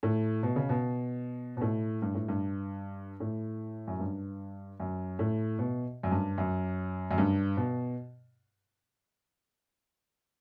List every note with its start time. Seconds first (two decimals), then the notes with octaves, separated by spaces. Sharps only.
0.03 A2
0.43 B2
0.56 C#3
0.69 B2
1.57 B2
1.61 A2
2.02 G2
2.15 A2
2.28 G2
3.20 A2
3.87 F#2
4.00 G2
4.80 F#2
5.19 A2
5.59 B2
6.03 F#2
6.11 G2
6.38 F#2
7.11 F#2
7.18 G2
7.57 B2